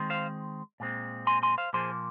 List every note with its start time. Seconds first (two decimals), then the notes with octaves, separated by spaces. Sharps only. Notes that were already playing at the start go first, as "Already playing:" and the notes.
Already playing: D#3 G#3 C4
0.10 C5 F5
0.80 A#2 G#3 C4
1.27 G#5 C6
1.43 G#5 C6
1.58 C5 F5
1.73 A#2 F3 A#3 G#4 C5